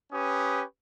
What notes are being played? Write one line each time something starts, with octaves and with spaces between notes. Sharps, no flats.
C#4 G4 B4 D#6